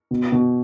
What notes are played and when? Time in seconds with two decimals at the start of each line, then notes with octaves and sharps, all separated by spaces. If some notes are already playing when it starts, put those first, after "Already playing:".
0.11 B2
0.32 B2